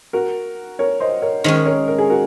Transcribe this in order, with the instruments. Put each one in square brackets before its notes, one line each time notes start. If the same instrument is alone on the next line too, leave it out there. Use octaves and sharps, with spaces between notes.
[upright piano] F#4 A#4
A#4 C#5
C5 D#5
A#4 C#5
[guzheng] D#3 G#3 C#4 [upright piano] C5 D#5
[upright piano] A#4 C#5
A#4
G#4
F#4 A#4